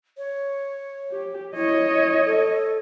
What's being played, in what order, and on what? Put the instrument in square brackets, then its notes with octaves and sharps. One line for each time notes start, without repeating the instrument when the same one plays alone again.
[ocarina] C#5
[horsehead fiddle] G4
[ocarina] E4 [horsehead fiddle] C#5 D#5
[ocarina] A4